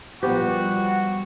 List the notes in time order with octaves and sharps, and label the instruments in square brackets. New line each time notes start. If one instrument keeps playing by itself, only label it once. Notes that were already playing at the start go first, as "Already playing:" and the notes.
[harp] A#2 G3 [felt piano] F3 B3 B4 [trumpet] F#4 [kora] G4